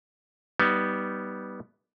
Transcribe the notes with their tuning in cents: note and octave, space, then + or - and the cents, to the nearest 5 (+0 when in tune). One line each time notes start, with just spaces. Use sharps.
G3 -10 B3 +0 D#4 +10